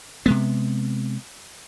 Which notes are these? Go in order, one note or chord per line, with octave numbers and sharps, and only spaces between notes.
C3 G#3 B3